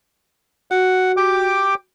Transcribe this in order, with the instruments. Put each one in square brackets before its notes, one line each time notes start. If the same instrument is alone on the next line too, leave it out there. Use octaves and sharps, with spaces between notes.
[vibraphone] F#4 [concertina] F#5
[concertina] G4 G5 D6